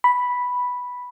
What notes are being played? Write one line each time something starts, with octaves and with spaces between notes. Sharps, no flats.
B5